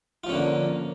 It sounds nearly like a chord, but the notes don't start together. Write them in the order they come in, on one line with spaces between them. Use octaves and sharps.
F4 F3 C#4 D3 A#3